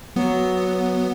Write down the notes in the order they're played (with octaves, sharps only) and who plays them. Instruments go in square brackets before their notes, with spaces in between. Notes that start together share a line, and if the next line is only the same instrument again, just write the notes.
[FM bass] F#3 [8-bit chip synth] B3